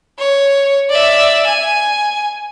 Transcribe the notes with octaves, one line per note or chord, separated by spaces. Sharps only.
C#5
D5 E5
G#5